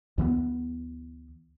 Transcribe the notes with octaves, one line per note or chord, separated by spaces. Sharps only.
D2 E3 G3 B3